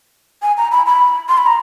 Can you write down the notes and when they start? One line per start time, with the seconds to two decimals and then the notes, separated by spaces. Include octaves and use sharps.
0.42 G#5
0.57 A#5
0.72 B5
0.86 B5
1.29 C6
1.38 B5
1.46 A#5